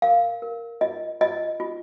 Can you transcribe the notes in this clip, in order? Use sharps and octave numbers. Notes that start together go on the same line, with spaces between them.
A#4 F5
A#4
F4 D#5
F4 D#5
F4